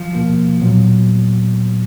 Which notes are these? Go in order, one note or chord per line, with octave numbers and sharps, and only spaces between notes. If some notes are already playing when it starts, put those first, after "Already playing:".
Already playing: F3
B2 A#3 F4
A#2 F#3 B3